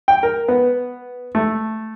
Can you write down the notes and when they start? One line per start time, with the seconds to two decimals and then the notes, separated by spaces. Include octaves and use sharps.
0.08 G5
0.23 A#4
0.48 B3
1.35 A3